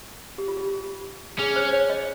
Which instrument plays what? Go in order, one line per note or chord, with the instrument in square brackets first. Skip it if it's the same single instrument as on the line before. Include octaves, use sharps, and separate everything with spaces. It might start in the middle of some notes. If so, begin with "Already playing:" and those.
[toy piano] G4
F4
G4
[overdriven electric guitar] C#4 [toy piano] G#4
[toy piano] C5
C#5
D#5